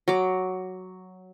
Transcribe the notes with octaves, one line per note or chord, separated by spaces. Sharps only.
F#3 D6